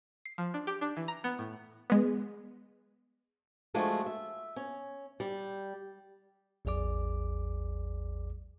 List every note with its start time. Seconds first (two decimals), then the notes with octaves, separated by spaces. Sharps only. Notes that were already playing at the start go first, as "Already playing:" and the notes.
0.25 C7
0.38 F3
0.54 D4
0.67 G4
0.81 D4
0.97 E3
1.08 A#5
1.24 B3
1.39 A2
1.90 G#3 B3
3.74 F3 G#3 A3 D4 F4 F#4
4.06 E5
4.56 C#4
5.20 G3
6.65 A1 E2 F#3 G#4 D5 D6